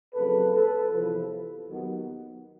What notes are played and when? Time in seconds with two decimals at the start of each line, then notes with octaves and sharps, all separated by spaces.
0.14 F2 C#3 F#3 A#3 A4 B4
0.52 A4 B4
0.91 E2 C3 F3
1.68 D#2 D#3 F#3 B3